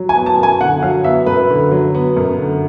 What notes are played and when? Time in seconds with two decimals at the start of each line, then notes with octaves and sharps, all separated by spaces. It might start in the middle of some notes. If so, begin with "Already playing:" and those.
Already playing: F#3
0.09 G#5
0.15 B3
0.26 A5
0.37 F#2
0.43 G#5
0.61 D3 F#5
0.82 F#3 F5
1.04 B3 E5
1.26 F#2 B4
1.50 D3
1.71 F#3
1.95 B3
2.17 F#2
2.38 D3